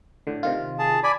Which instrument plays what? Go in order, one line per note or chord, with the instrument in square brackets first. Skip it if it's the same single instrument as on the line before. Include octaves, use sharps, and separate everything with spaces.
[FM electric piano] A2 D3
C3 D#3 F4
[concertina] G#4 A5
D5 G#5 B5